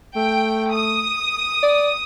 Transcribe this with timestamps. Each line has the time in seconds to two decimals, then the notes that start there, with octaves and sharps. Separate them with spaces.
0.17 A3 G5
0.72 D#6
1.63 D5